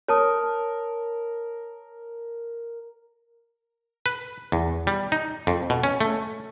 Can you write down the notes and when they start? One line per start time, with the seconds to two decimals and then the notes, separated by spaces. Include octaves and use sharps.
0.08 A#4 C#5 A5 D#6
4.06 B4
4.52 E2
4.87 G3
5.12 D#4
5.47 F2
5.70 B2
5.83 C#4
6.01 A3